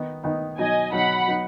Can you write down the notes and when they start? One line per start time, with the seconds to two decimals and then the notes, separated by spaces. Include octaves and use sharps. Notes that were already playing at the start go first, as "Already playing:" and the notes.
Already playing: D#3 B3 D#4
0.23 D#3 B3 D#4
0.58 B2 F#3 D#4 D#5 G#5
0.92 B2 F#3 D#4 F#5 B5
1.28 F#3 B3 D#4